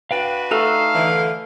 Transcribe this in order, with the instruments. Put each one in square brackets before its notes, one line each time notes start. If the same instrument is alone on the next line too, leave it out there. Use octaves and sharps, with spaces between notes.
[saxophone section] D4 F#4 B4 [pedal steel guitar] F5 G5
[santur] A3 A4 [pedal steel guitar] D#4 A#5 E6 [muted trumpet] F5
[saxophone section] D3 E3